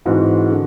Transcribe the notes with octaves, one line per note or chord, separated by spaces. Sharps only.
G#2 E3 G#3 C4 F#4
D3